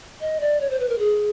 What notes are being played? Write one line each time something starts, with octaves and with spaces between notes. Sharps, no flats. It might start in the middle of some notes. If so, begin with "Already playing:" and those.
D#5
D5
C#5
C5
B4
A#4
G#4